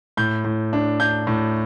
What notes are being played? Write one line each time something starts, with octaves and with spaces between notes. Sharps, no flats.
A2 G6
A2
D4
D4 G6
A2